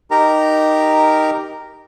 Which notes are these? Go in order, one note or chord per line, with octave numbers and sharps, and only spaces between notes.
D#4 G4 A#4 A#5